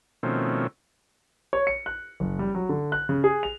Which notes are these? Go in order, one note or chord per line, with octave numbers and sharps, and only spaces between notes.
B2 D#3 F3 A3 C4 C#4
C#5
C#7
F#6
F#1
G3
F#3
D3
F#6
C#3
G#4
F7